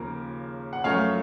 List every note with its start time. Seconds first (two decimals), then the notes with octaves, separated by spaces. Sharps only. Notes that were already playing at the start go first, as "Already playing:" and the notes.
Already playing: D#2 C#3 F3 A#3 A#4
0.73 F#5
0.84 F#2 F3 A3 C#5 F5